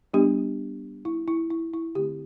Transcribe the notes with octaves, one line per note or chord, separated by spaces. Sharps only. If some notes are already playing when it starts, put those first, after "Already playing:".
G3 B3 D4 G4
E4
E4
E4
E4
D3 A3 C4 G4